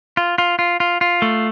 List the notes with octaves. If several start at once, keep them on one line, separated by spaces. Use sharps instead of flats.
F4
F4
F4
F4
F4
A3